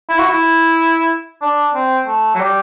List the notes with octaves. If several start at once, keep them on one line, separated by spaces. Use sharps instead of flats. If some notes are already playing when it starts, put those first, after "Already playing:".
E4
F#4
E4
D4
C4
A3
F#3
G3